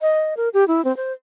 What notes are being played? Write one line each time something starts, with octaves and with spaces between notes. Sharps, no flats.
D#5
A#4
G4
E4
C4
C5